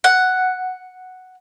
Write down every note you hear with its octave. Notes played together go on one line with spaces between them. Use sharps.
F#5